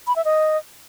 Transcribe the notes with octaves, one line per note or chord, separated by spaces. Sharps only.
B5
E5
D#5